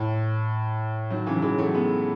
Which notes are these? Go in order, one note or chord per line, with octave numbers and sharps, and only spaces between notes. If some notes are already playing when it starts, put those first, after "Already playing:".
Already playing: A2
D#3 F#3
C#3 E3
F#3
E3 G#3
F#3 A3
G#3 B3